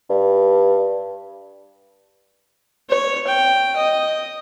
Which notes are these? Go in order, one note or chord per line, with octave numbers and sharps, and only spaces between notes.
G2
C#5
G5
D#5